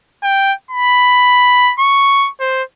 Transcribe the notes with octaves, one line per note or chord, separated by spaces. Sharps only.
G5
B5
C#6
C5